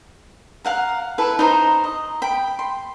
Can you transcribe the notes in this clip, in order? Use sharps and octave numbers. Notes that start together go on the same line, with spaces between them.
F5 F#5 A#5
E4 A4 B4
D#4 C5 A#5
D#5
G5 B5
C6